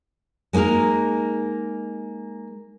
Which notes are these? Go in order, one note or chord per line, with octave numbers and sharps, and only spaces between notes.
G#3 A#3 D#4 G#4 A#4